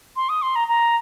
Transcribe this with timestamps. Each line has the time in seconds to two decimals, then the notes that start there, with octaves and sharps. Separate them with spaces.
0.16 C6
0.29 D#6
0.42 C6
0.56 A#5
0.68 A#5